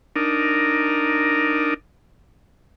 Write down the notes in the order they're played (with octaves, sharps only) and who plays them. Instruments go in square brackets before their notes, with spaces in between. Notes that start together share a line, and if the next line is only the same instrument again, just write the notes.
[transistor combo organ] D4 D#4 A#4